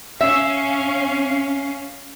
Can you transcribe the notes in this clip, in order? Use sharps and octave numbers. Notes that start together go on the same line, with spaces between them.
C#4 E5 F5